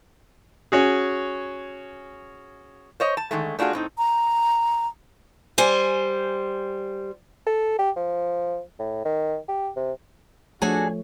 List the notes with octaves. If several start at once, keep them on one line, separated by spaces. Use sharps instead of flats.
C#4 F#4 G#4
C5 C#5 D#5
A5
D3 D#3 G#3 A3
A3 D4 F4 F#4 G#4
A2 C4 D#4
A#5
G3 C5 G#5
A4
G4
F3
A2
D#3
G4
C3
F3 A3 D4 F#4 G#4 A4 C#5 G#5